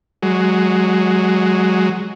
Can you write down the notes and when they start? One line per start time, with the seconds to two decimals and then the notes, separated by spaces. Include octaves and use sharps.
0.23 F#3 G#3